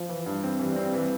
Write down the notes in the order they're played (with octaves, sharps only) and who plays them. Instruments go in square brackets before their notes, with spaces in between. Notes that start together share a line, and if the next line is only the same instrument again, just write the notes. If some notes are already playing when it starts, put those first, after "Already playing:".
Already playing: [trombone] F3
[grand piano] E3
G2
C4
[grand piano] E3 [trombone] G3
[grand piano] C4
E3